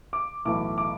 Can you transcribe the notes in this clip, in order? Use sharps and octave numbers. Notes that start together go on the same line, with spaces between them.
D6
B1 A2 E3 A3 D6
D6